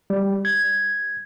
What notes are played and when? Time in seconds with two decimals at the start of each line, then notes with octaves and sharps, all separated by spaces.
0.10 G3
0.45 G#6